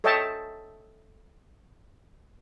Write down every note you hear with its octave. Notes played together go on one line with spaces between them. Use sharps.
A4 C#5 D#5 E5 G5 A5